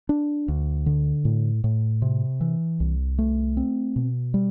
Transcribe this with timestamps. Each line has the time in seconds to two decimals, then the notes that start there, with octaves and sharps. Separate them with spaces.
0.09 D4
0.48 D2
0.86 D3
1.25 A2
1.64 A2
2.02 C3
2.41 E3
2.80 C2
3.18 A3
3.57 C4
3.96 B2
4.34 G3